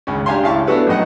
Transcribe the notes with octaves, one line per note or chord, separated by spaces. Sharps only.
G#1 C#2 C#4
D4 G4 F5 G#5 A#5 C6
C#2 E4 F5 A5 C#6
B3 D4 E4 F#4 A4 B4
A#1 F#2 A2 D#5 F#5